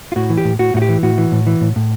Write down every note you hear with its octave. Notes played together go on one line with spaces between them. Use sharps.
F4
A2 F#4
E3
G4
A2
A2 F#4
A2 F#4
G4
E3
A2 F#4
E3
A2
E3
A2
A2